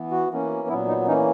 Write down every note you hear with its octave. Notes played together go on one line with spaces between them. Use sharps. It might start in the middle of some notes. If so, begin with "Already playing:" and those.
Already playing: E3 B3
F#4
E3 A#3 C#4
A#2 F#3 B3 E4
D#4
E3 A#3 C#4 D#4